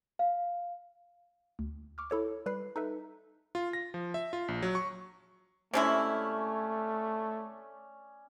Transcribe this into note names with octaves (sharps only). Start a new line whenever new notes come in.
F5
D2
C#6 D6 F6
E4 A4 C#5 D6
G3 B4 B5 C7
D#4 A4 B4 E5
F4
A#6
F3
E5
F4
A#1
F#3
C#6
C3 G#3 A3 C#4 E4 D5